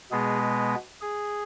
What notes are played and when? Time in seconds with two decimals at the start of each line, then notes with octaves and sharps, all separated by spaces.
0.11 B2 G#3 B3 G#4
1.02 G#4